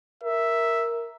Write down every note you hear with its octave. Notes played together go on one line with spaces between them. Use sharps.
A#4 E5